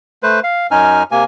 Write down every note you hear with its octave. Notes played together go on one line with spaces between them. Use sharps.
A3 B4 C5
F5
F#2 C#4 D#4 G#5 F6
C3 A#3 G#5